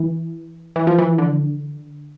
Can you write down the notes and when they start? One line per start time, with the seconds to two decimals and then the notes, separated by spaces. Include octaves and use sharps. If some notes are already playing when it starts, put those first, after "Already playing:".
Already playing: E3
0.76 E3
0.87 F3
0.99 E3
1.18 D3